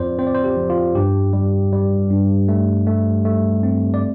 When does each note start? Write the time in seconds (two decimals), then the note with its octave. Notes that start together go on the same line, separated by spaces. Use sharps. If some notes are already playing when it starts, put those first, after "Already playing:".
Already playing: F2 C4 F4 C5 D5
0.19 C4 C5
0.27 D5
0.35 C5
0.44 G4
0.57 F2
0.70 F4
0.95 G2 G4
1.33 G3
1.72 G3
2.10 G2
2.48 A3
2.87 A3
3.25 A3
3.63 C4
3.94 D5